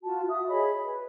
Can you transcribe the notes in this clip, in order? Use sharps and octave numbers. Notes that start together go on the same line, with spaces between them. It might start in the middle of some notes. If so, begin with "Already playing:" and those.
F4 F#4 A5
F#4 E5 D#6
G#4 C#5 D#5 B5
B4